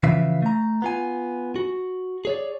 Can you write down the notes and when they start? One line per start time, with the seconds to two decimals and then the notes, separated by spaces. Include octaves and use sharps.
0.03 C#3 E3 F3 B4 E5 F5
0.42 A3 A#5
0.82 B3 F4 G#5
1.56 F#4
2.25 G#4 C#5 D5